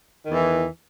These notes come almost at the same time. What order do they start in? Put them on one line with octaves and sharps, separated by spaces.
D#3 E2 E3